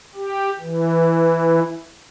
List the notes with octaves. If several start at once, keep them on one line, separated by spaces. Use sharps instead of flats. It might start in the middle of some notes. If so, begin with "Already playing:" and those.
G4
E3